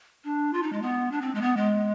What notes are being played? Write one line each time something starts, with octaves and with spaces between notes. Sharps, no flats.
D4
F4
D#4
G#3
B3
D4
C4
G#3
B3
G#3